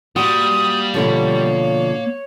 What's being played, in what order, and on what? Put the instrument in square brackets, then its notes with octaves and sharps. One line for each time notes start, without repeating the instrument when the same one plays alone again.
[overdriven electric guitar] G3 [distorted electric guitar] A#3 C6 [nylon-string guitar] F#4 [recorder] D#6
[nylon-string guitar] B2 D3 F3 [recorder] C#5